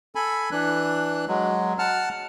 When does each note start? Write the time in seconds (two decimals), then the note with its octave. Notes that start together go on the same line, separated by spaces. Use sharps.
0.15 A4 G#5 B5
0.51 E3 D4 F#6
1.28 F#3 G#3
1.79 F#5 A5 F6